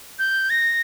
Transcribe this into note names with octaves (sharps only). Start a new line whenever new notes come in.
G6
A#6